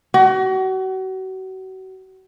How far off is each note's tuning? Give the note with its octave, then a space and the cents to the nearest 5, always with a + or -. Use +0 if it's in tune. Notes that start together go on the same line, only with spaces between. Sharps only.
F#4 +35